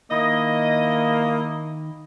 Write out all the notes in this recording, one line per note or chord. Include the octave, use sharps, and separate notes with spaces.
D#3 A#3 E4 D#5